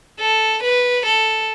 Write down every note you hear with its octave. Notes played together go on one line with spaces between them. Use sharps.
A4
B4
A4